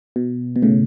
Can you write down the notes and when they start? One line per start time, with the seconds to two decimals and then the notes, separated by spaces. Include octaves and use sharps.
0.16 B2
0.56 B2
0.62 A2 C#3